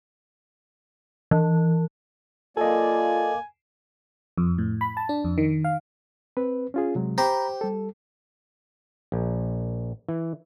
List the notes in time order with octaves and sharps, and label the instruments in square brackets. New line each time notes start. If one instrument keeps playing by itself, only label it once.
[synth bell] E3
[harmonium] A#3 D5 [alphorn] F4 [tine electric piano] A4 D#5 [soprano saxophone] G#5
[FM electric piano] F2
A2
B5
A5
D4
F2
D#3
F5
[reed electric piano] C4 B4
C#4 F4 G#4
C3 F#3 G#3
[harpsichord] G4 C5 [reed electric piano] A#5 B5
[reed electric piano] G3 A4
[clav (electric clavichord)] A#1
E3